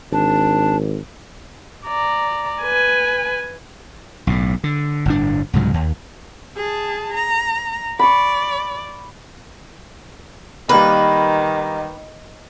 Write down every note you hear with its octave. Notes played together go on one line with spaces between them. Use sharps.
G#1 D4
D5 A#5
B4 G#5
B1 A2
D3
G1 A2 D4
C2 G#2 C#3 F#3
D#2
G#4 A5
A#5
D5 B5 C#6
D#3 G3 A#3 B4